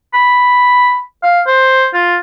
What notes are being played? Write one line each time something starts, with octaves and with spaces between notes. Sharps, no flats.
B5
F5
C5
F4